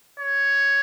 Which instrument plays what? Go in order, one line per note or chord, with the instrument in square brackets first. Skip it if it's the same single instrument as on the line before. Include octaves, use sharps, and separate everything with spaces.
[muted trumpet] C#5